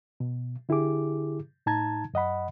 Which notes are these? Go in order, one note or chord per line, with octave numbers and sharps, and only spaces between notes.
B2
D3 E4 G4 G#4 D6
A2 D#4 A5 A#5 G#6
F#2 D#5 F#5 B5